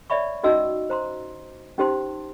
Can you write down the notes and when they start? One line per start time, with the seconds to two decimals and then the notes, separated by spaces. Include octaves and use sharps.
0.10 C#5 D5 E5 B5 C#6
0.43 C#4 D#4 F#4 D#5 E6
0.90 C5 A#5 C6
1.78 C#4 D#4 G4 C5 A5 C6